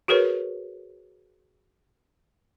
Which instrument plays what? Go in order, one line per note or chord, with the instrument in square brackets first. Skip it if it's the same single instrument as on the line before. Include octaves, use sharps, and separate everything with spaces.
[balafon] F#4 G#4 A#4 B4 C#5